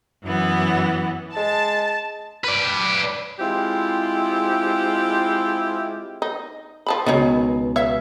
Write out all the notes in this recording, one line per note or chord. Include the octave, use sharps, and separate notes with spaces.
F#2 E3 B3
G#3 A5
B4 D5
G#3 C4 E4 F4 G4
D#4
F3 A5 B5
C#2 B2 D#3 D#4 C#5
C#5 E5 F5